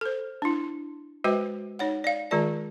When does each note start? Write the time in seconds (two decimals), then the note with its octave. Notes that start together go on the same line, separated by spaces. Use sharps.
0.01 A4 C5
0.42 D4 E4
1.24 G#3 F#4 B4 C5 D#5 G5
1.79 D#4 C#5 F#5
2.04 D5 F5
2.31 D#3 G#3 F4 G#4 D5 A5